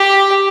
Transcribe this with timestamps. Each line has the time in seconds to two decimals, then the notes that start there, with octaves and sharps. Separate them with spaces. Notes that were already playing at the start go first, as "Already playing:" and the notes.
Already playing: G4